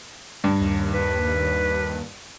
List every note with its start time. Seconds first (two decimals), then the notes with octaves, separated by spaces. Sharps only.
0.44 G2
0.61 D#2
0.93 B4